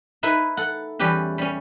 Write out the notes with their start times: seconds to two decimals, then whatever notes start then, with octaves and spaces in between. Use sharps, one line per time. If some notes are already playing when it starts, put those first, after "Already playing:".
0.23 D#4 E4 B4
0.57 A4 F#5
0.99 E2 G3 C#4 G4 B4
1.38 G3 C#4